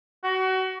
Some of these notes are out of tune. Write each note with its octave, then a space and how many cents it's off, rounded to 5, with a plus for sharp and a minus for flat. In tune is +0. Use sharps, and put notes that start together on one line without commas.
F#4 +30